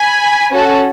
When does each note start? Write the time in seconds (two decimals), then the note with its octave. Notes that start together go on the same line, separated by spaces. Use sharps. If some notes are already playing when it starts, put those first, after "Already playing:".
Already playing: G#5 B5
0.52 C#4 F#4 A4